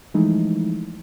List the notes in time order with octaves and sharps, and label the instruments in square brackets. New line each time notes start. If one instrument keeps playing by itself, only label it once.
[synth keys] E3 F3 G#3 A3 D#4 E4